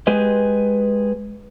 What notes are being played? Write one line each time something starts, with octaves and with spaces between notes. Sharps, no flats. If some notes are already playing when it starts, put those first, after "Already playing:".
G#3 G4 G#4 B4 D#5